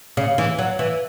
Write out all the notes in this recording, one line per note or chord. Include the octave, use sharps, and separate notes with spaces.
C#3
E3
F#3
E3